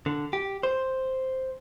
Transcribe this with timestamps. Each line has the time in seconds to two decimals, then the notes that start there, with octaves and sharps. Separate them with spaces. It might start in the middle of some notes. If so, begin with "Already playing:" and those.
0.06 D3
0.33 G4
0.63 C5